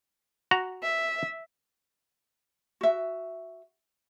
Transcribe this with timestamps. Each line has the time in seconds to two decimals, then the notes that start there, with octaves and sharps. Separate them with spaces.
0.51 F#4 A#5
0.83 E5
2.81 F#4 E5